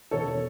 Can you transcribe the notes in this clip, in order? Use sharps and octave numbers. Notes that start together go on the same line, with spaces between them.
E1 A4 C#5